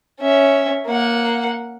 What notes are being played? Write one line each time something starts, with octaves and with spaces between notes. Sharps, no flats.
C#4 E5
A#3 F#5